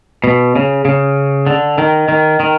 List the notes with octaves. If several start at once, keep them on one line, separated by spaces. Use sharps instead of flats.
B2
C#3
C#3
D3
D#3
D#3
D#3